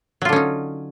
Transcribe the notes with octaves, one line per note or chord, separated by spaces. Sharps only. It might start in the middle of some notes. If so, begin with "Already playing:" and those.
D3 F#3 C#4 D#4 F4